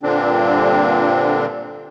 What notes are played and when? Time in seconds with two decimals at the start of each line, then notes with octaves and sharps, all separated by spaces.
0.03 G2 A#2 D3 C4 D4